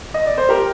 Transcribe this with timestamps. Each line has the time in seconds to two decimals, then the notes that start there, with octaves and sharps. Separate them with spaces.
0.14 D#5
0.26 D5
0.37 C5
0.49 G4 A#4